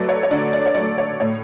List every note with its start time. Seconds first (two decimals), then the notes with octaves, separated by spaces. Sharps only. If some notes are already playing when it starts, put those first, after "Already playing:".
Already playing: F#3 A3 B4 D5
0.09 C#5
0.23 C#5
0.31 D3 D5
0.53 D5
0.66 C#5
0.75 F#3 A3 D5
0.98 C#5
1.20 A2 C#5